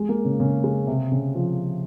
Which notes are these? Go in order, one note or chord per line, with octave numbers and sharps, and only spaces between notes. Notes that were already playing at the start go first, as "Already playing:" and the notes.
Already playing: G#3
A#3
C#3
C#3
G#3
C3
C#3
F3